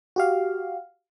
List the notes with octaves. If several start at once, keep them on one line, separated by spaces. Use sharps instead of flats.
F#4 G4 F5